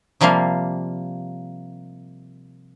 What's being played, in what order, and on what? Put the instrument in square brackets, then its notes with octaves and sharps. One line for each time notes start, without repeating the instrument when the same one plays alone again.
[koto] C3 F3 G3 A#3 F5